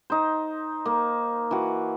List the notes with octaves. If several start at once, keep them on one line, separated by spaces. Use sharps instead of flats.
D#4 C5
A#3
E3 F#4